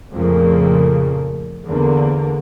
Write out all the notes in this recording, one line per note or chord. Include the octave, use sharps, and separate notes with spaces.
F2 A#2 C#3 F3 A3 A#3
E2 D3 A#3